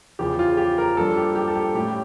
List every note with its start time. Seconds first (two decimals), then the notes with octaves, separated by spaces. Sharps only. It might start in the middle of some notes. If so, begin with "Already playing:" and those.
0.19 E2 C#3 F3 G4
0.39 F4
0.57 G4
0.78 A#4
0.97 G2 F3 A#3 A4
1.17 G4
1.35 G4
1.48 A4
1.55 G4
1.75 A2 G3 C#4 G4